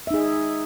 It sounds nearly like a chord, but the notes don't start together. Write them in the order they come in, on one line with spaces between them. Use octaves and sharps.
E5 D#4 G#4